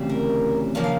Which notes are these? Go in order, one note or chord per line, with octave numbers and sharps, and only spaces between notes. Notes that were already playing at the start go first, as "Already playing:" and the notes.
Already playing: D2 C#3 E3 G3 C4
A#4
C#3 F3 A#3 D4 D#5
F5